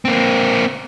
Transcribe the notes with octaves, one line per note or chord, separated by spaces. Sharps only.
A#3 C4